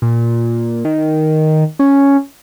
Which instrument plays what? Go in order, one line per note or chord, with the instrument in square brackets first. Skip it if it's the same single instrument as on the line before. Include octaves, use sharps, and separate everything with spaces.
[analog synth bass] A#2
D#3
C#4